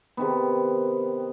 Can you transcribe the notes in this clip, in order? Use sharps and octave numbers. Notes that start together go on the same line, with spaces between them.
C3 D#3 B3